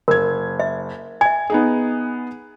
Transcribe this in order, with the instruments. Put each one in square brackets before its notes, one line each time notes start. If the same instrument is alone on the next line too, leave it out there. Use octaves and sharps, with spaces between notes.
[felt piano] F#1 G#6 [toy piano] A#4
[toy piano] E5
[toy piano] E5 G#5 [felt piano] G#6
[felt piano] B3 D#4 G#4